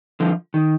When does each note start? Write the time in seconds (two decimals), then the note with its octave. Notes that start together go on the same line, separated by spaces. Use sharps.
0.20 D3 F3
0.54 D#3